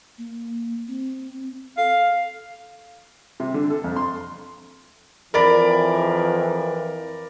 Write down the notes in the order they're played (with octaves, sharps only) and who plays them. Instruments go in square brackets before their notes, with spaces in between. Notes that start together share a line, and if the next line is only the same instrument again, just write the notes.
[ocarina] A#3
C4
[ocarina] A4 [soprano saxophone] F5
[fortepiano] C3
D3
A4
F2
C6
[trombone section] F2 E3 [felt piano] A#4 D5 B5